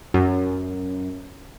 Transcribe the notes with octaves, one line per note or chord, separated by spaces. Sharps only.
F#2